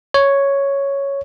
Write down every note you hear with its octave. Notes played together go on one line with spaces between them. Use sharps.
C#5